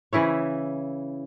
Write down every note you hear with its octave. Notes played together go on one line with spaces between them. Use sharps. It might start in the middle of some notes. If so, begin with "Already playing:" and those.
C#3 E3 E4 C#5